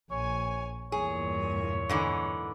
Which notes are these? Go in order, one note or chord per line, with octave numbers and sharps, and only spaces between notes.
A#1 C#5 G#5
E2 G2 A#2 G#4 C#5
G#2 D3 E3